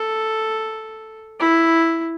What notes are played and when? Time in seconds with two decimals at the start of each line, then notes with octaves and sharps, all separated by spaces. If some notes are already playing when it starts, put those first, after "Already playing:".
Already playing: A4
1.40 E4